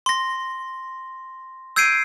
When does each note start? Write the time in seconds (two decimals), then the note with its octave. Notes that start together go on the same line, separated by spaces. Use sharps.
0.06 C6 A#6
1.76 E6 G6 G#6 C7 D7 D#7